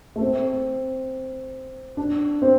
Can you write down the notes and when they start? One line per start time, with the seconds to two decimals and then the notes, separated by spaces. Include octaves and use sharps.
0.16 A3
0.21 C4
1.97 D4
2.42 C4